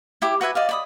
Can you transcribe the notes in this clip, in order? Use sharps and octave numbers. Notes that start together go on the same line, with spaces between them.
E4 G4 D6
F#4 B4 E5 G#5
D5 D#5 F5
D5 B5 D#6